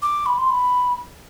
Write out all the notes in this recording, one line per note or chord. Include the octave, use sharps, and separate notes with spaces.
D6
B5
C6
B5